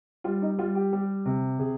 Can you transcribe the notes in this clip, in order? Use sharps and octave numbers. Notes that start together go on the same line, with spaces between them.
G3 F4
D#4
G3 F4
G4
G3
C3
C3 G#4